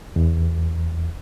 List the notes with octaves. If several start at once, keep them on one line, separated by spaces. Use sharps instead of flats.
E2